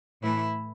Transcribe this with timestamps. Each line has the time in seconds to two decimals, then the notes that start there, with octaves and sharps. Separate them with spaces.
0.22 A2 E3 A3 E4